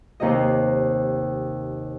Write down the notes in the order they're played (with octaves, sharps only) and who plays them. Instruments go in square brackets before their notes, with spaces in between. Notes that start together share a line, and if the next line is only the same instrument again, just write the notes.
[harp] D#2 C3 D#5